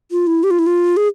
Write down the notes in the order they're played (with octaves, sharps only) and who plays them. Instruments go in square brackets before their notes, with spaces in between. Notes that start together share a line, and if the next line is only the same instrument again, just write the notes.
[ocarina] F4
E4
G4
F4
E4
F4
G#4